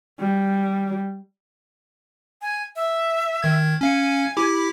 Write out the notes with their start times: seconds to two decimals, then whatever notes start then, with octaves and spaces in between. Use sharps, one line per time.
0.19 G3
2.42 G#5
2.76 E5
3.43 D#3 G#6
3.81 C#4 F5 G#5 C#7
4.37 E4 G4 D6
4.53 B5